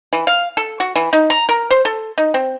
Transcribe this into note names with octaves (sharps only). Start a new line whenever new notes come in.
E3
F5
A4
F#4
E3
D#4
A#5
A#4
C5
A4
D#4
C4